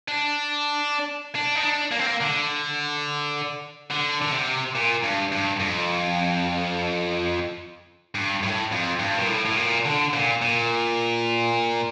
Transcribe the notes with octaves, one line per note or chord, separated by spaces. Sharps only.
D4
D4
D#4
D4
A#3
C4
A#3
D3
D3
D3
C3
A#2
G2
G2
F2
G2
A2
F2
G2
A#2
A2
A2
A#2
D3
A#2
A#2